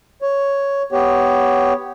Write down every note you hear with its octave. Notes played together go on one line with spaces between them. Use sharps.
C#5
B3 G4 C#5